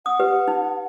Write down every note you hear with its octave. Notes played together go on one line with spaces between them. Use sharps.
F#5 D#6
G4 B4
D#4